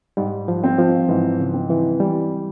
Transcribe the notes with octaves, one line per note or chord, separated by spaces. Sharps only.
G#2 G3
F3
C4
F3
G#2 E3
C#3
C4
E3
E3 G3